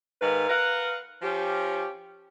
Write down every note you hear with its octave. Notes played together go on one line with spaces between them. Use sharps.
G#2 D#3 B4 F5
A#4 B4 F5 F#5
F3 C#4 G4